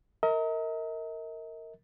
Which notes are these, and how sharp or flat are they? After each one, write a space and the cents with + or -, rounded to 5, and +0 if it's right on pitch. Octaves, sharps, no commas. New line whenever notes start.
A#4 -20 D#5 +40